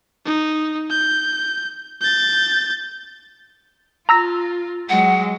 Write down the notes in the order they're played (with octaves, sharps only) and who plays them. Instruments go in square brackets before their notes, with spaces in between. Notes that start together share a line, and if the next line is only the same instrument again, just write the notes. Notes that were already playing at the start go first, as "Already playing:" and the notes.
[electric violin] D#4
G6
G6 A6
[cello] F4 [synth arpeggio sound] A#5 E6 A#6
[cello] F#3 G#3 [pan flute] F#5